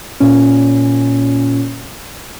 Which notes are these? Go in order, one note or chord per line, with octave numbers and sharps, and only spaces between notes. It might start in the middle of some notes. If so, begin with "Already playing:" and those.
A#2 C#4